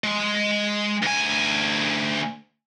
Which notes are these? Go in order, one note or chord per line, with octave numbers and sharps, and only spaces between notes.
G#3
D2 G#5